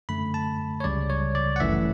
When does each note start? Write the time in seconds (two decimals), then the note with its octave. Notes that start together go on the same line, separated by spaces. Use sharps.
0.09 F#2 D3 A3 B5
0.34 A5
0.80 C#5
0.84 C#2 C#3 G3 D5
1.10 C#5
1.35 D5
1.56 F#5
1.60 G1 F#2 E3 A3 E5